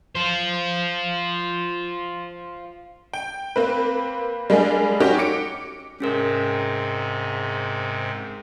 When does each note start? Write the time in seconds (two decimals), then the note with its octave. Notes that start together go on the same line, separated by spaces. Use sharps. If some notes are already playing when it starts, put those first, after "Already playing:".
0.15 F4 C5
3.14 G5
3.56 A#3 C4 B4
4.50 G3 G#3 A#3 D4 G#4
5.00 C#4 D#4 F#4 G4 C#5
5.18 D6 C#7 D7
6.00 G#2 C3 C#4 G#4 A#4